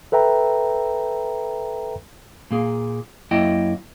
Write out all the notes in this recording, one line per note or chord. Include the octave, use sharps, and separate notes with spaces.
A4 B4 E5 G5 A#5
A#2 A#3 G#4
F#2 A#3 E4 D#5 G5